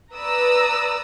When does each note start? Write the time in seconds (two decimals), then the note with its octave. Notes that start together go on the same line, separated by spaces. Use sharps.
0.14 B4 D5 A#5 D#6 E6